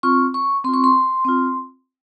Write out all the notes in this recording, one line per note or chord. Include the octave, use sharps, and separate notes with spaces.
C4 F4 C#6
C#6
C4 F4 C6
C#6
C6
C4 F4